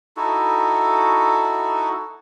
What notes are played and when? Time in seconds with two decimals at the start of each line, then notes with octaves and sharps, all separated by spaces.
0.17 D#4 E4 F#4 A4